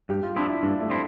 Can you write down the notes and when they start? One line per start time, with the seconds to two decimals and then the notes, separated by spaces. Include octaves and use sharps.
0.09 G2 G4
0.23 F4
0.36 F3 C4 D4 E4
0.49 E4
0.63 G2 D4
0.81 A3
0.90 F3 C4 E4